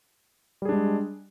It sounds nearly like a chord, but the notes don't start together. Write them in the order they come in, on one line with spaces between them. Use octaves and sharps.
G3 G#4 D4 G#3